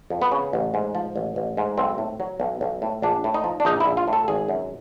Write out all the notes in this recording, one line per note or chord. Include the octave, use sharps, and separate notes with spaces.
F2
B3
C#3
A1
G#2
F3
A1
A1
G#2
B1 C4
A2
F#3
B1
B1
A2
A#1 D4
A2
D#4
F3
D4
A#1 D#4
E4
A#1
F4
A2
A4
G#1 G#4
F#2